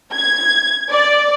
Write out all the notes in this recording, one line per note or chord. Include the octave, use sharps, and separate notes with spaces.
G#6
D5